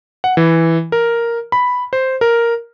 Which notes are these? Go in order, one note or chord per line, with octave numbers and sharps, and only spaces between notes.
F#5
E3
A#4
B5
C5
A#4